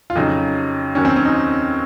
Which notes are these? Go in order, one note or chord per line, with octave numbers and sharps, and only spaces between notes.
F4
F2 C#3 F#3 D#4
D#2 D#3 F#3 C#4
C4
C#4
D#4